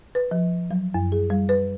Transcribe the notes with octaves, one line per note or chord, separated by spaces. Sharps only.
B4
F3
F#3
F#2
G#4
G3
B4